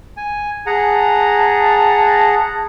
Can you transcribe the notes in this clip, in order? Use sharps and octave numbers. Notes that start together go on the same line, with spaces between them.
G#5
G#4 F#5 A5 A#5